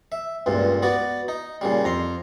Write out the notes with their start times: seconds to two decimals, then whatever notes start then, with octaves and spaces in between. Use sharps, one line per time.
0.12 E5
0.46 C#2 G2 A#2
0.82 B3 F#4 D5
1.28 D#4
1.61 A#2 C#3 G3
1.84 F2 A#5 C6